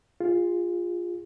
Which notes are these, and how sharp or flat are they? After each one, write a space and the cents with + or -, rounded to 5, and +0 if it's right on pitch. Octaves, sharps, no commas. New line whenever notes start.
F4 +0 G#4 -35